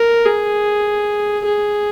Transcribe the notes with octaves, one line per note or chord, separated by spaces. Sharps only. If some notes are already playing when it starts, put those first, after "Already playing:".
Already playing: A#4
G#4
G#4